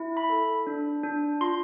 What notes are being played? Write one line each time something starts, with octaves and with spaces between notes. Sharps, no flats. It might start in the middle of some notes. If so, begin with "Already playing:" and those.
Already playing: E4
B5
A4
D4
D4
F4 C6